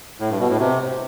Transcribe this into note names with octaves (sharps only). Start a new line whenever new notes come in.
A2
G2
B2
A2
C3